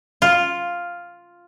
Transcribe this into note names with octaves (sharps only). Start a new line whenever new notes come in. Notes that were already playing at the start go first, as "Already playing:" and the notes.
F4